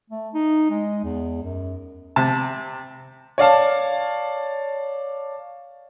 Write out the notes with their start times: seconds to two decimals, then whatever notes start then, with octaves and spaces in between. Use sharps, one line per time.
0.10 A3
0.34 D#4
0.70 G#3
1.04 E2
1.43 F#2
2.16 C3 A5
3.38 C#5 D5 F5 A5